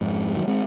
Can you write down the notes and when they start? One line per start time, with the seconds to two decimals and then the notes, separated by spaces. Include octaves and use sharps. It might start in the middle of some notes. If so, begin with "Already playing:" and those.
0.01 F2 G#2
0.29 G#3
0.36 D#3 F#3
0.47 G#3 C4